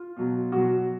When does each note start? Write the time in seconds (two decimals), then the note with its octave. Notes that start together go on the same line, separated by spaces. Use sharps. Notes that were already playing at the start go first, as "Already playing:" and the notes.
Already playing: F4
0.17 B2 F#3
0.52 B2 F#3 F#4